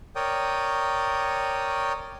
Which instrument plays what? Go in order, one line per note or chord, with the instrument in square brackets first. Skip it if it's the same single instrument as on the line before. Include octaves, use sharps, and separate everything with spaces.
[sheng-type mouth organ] A#4 C#5 D5 G5 D#6